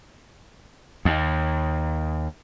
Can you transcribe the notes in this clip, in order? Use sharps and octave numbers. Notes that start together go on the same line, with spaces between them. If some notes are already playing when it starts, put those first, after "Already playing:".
D#2